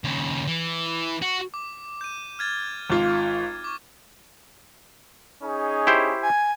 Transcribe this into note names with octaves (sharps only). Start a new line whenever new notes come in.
D#2 C#3
E3
F#4
D6
G6 D#7
F6 G#6 A6
G#1 F4
C#6 D6
C#4 D#4 G#4
E4 G4 C5
G#5